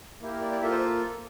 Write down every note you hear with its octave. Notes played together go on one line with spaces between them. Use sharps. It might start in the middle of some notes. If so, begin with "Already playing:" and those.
A#3 E4 G4
A#4
D5
D5
A#3 F4 A4 E5
C5